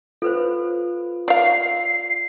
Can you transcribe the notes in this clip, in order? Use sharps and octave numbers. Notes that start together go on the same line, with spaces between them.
F4 A4 B4 C5
A#4 D5 F5 C7